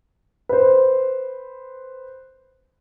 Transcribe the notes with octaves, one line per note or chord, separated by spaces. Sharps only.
B4 C5